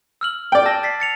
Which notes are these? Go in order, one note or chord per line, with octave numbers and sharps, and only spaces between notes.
E6 F6 F#7
D5 G5
A5 E6 A#6
A6 B6 C7
A6 C#7 F7